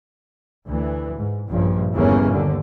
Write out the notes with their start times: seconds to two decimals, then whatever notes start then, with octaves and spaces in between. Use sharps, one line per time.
0.67 D2 E3
1.17 G#2
1.48 A#1 G2 C#3 F3
1.94 G1 E2 C#3 E3 A#3 C#4
2.31 D#2 D3